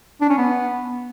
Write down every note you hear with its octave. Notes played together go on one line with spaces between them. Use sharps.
D4
C#4
B3